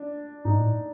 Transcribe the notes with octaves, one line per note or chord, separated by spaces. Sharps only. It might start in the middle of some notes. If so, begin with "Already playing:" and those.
Already playing: D4
G#2 D#4
A2